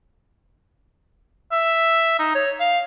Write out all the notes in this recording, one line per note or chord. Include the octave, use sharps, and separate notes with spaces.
E5
D#4
C#5
F5